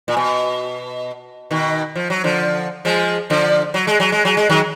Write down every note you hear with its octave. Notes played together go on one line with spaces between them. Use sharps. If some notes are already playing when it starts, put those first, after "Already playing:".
A#2
B2
B2 D#3
F3
F#3
D3 F3
F3 G#3
D3 F3
F#3
G#3
F#3
G#3
F#3
G#3
D#3 F#3